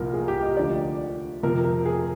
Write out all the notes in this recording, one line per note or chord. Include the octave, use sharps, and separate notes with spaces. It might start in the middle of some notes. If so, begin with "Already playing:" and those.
Already playing: C2 A#2 F3 A#4
G#4
G4
D#5
D2 D3 F3 D5
F2 C3 F3 A#4
A#4
G#4